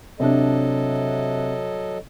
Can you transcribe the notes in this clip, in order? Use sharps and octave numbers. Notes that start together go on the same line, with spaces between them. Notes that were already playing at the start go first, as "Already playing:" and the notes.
C3 F#3 D4 A4 D#5